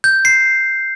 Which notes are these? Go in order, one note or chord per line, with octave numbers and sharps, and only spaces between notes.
G6
C7